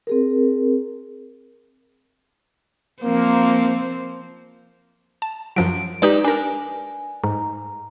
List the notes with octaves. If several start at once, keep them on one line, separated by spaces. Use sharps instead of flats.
C4 G#4 A#4
F3 A#3 C4 C5
A5
F#2 F3 F#3 D7
G#3 D#4 G4 B4 D5
D4 A#4 G#5
G#2 A#5